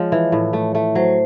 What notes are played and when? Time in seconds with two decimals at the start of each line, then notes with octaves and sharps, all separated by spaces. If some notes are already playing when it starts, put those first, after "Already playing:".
Already playing: F3 G#3 C#5
0.12 E3
0.32 A2
0.53 A3
0.75 A3
0.95 F#3 C5